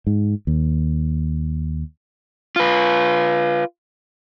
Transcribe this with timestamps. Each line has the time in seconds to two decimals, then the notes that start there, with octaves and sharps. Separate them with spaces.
0.07 G#2
0.47 D#2
2.56 F4 B4